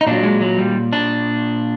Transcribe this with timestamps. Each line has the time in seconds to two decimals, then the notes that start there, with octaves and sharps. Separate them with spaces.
0.01 D#4
0.07 A#2 F#3 D4
0.23 G#3
0.41 F#3
0.59 G3
0.93 D4